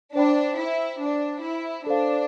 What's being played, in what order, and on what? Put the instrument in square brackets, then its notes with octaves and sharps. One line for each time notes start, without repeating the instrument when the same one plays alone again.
[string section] D4 [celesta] C5 G5 B5
[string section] E4
D4
E4
[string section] D4 [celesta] A4 C5 F5